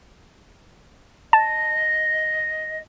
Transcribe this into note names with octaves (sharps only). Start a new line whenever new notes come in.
D#5 A5